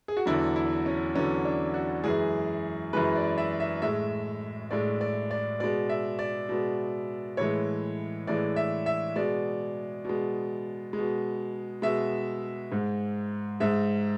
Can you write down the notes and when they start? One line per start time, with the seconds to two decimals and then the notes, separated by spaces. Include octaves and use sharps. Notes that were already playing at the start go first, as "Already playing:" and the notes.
0.08 G#4
0.17 F#4
0.26 E2 D3 F#3 E4
0.56 E4
0.86 C#4
1.15 E2 D3 F#3 C#4
1.45 D4
1.74 F#4
2.04 F#2 E3 G#3 G#4
2.93 F#2 E3 G#3 B4
3.16 D5
3.38 E5
3.60 E5
3.82 A2 G#3 E5
4.71 A2 G#3 D5
5.01 D5
5.31 D5
5.60 B2 G#3 D5
5.89 E5
6.19 D5
6.49 B2 G#3
7.37 A2 E3 G#3 C#5
8.27 A2 E3 G#3 D5
8.56 E5
8.86 E5
9.16 B2 G#3 D5
10.05 B2 G#3
10.93 G#3
10.98 B2
11.82 B2 G#3 E5
12.71 G#2 G#3
13.60 G#2 G#3 E5